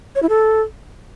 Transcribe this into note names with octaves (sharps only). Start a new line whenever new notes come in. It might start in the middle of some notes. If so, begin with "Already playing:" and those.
C#5
E4
A4